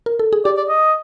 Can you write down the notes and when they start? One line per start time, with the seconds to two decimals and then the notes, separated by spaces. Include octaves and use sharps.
0.06 A#4
0.19 A4
0.33 G#4
0.45 G4 D5
0.57 D5
0.69 D#5